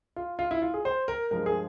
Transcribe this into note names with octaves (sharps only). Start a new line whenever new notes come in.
F4
F4
E4
F4
G#4
C5
A#4
G2 F3 G#3 A#4
G#4